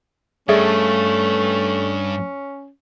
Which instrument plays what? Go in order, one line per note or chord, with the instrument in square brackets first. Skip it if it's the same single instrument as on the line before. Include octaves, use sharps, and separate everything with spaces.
[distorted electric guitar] G2 [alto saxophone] A3 [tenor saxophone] C#4 [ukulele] G#4 D5 E5